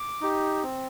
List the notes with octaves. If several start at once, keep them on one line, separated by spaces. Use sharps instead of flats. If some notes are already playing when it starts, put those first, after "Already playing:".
Already playing: D6
D#4 G4
C4